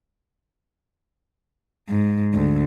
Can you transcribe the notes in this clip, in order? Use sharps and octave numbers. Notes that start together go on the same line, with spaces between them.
G#2
D2